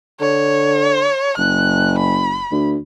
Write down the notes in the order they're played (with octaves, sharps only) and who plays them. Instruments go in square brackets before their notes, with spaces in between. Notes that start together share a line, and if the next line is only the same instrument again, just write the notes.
[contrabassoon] D3 [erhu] C#5
[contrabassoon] F#1 [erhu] F#6
[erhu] B5
[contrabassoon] D2